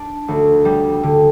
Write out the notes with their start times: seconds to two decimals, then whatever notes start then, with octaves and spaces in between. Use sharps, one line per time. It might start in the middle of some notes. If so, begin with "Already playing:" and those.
Already playing: D4
0.28 D2
0.65 G3
1.03 D3